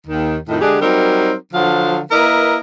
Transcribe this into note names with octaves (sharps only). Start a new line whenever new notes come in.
D#2 D#3
F2 A2 D#3
D3 G#3 D4 G4 G#4
F#3 G3 C4 D#4 A#4
D3 F3 F#3 C5 F5
A#3 E4 A#4 B4 D#5